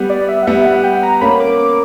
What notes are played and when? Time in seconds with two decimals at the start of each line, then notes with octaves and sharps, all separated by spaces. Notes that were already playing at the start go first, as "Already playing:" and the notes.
Already playing: G3 B3
0.10 D5
0.28 E5
0.43 F#5
0.47 G3 B3 E5
0.65 F#5
0.84 G5
1.03 A#5
1.21 A#3 C#4 B5
1.40 D6
1.59 D6